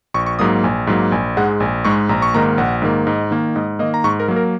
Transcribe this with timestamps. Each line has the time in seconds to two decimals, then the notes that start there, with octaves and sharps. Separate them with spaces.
0.14 A#1 C#6
0.26 C#6
0.39 G#2 F#3 A#3 D#6
0.64 A#1 G#5
0.87 G#2 F#3 A#3
1.12 A#1 G#5
1.37 G#2 G#3 F#5
1.60 A#1 G#5
1.85 G#2 G#3 C#6
2.09 A#1 A#5
2.22 C#6
2.34 G#2 D#3 A#3 A#5
2.58 A#1 F#5
2.82 G#2 D#3 A#3
3.07 G#2 D#5
3.31 D#3 A#3
3.56 G#2 D#5
3.79 D#3 A#3 D#5
3.94 A#5
4.04 G#2 C#6
4.20 A#4
4.28 F#3 A#3
4.36 A#4